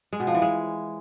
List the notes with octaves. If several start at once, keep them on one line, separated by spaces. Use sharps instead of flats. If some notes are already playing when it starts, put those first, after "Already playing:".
G#3
B2
F3
E3
G#3